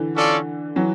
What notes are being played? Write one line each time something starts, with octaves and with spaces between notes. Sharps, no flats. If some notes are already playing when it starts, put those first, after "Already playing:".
Already playing: D3 E3
C#4 F4 A4 D5
E3 F#3